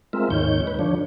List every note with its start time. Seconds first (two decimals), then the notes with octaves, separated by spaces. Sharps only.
0.13 G#3 C4 F4 A#4 E5
0.30 D#2 G#2 D#3 C#5 G6
0.67 B4
0.79 D3 F3 D4 C#5